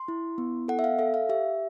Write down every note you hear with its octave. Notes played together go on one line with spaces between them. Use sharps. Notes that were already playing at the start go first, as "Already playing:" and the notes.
Already playing: C6
E4
B3
A4 F#5
E5
F5
A4 E5
F5
G4 E5